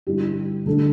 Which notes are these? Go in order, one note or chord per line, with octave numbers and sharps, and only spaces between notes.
G2 D3 G3 E4 G4
D2 D3 G3 D4 A4